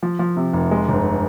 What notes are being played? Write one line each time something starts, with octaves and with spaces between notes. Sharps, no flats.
F3
F3
C3
F1
G#3
G1